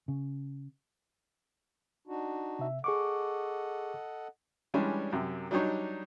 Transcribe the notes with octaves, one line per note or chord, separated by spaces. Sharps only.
C#3
D4 D#4 F#4
C3 E5
G#4 A4 D#5 F#5 C#6 D6
E3 G3 G#3 C#4 D4
F#2 C3
F#3 G3 D4 D#4 C#5